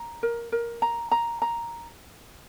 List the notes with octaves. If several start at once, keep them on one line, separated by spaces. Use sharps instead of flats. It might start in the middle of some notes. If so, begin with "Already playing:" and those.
Already playing: A#5
A#4
A#4
A#5
A#5
A#5